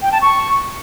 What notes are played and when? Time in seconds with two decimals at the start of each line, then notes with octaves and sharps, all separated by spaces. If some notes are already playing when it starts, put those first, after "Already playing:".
0.02 G5
0.12 A5
0.22 C#6